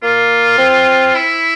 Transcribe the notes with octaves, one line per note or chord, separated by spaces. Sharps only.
A#3 F4
C4
E4